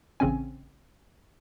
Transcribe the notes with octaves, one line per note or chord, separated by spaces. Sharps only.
A1 C#3 C4 C#4 G#5